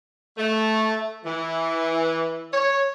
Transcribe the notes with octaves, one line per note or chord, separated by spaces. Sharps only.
A3
E3
C#5